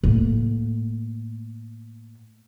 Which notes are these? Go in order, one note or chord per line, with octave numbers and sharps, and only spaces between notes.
A2 A#3